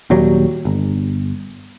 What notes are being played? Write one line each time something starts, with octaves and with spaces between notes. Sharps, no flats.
D#1 D#2 F#3 G3
G1